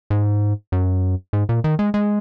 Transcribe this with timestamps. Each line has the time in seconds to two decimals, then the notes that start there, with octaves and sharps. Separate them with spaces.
0.10 G#2
0.72 F#2
1.33 G#2
1.49 A#2
1.64 D#3
1.79 G#3
1.94 G#3